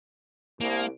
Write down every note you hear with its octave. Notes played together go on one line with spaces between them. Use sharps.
C2 A#3